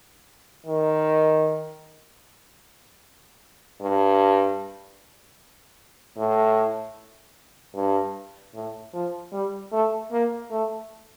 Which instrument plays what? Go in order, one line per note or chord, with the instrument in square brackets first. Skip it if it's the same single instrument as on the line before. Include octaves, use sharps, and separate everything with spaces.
[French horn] D#3
G2
A2
G2
A2
F3
G3
A3
A#3
A3